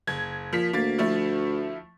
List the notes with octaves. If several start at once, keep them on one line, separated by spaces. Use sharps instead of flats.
F#1 G#6
A#2 F3 B6
D2 A#3 A6
F3 A3 E4